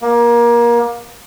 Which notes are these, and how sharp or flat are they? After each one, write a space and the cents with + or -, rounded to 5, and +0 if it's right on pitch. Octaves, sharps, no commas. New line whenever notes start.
A#3 +25